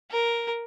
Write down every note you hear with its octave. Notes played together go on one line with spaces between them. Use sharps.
A#4